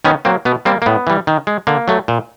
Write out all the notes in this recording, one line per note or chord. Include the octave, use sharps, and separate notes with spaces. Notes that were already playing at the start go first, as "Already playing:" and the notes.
D#3 B3 C#4
F#3 A#3 C4
B2 B3
G3 A#3 C4
A#3
A2 B3
E3 G3
D#3
G#3
D3 A#3
F#3 A3
A#2